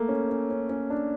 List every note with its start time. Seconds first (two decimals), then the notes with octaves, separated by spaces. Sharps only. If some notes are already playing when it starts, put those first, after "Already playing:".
Already playing: A3 A#3
0.09 C#4
0.29 C#4
0.50 C#4
0.70 C#4
0.90 D4